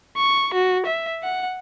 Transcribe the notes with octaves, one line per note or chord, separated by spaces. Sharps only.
C#6
F#4
E5
F#5